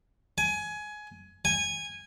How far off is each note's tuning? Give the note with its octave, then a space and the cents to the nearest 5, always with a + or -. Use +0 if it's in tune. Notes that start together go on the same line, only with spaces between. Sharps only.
G#5 +20
G#5 -15